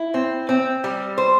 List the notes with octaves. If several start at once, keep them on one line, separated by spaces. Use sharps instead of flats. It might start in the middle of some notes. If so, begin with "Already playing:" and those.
Already playing: E4
C4
C4
G3
C5